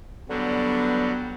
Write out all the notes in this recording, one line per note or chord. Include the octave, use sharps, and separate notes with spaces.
D3 F#3 G3 B3